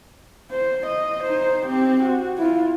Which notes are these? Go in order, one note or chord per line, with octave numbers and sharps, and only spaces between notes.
C5
D#5
D#4 C5
C4 G4
F#4
E4 F4